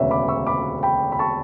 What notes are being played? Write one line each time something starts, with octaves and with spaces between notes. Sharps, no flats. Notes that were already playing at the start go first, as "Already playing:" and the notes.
Already playing: E1 D2 C#3 B4 C#5 D5 E5
B5 D6
C#6 E6
B5 D6
G5 B5
B5
A5 C#6